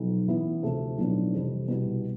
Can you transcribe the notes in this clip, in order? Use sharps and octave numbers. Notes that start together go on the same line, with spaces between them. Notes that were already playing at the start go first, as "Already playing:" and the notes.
Already playing: B1 F3
A1 A2 E3 B3 E4
D2 C3 F3 A3
B1 A2 F3 B3 D4
F1 F2 E3 G3 C4
C2 B2 G3